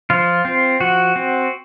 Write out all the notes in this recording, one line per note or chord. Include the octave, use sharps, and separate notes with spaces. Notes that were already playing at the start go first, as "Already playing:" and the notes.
F3 F4
C4
F3 F#4
C4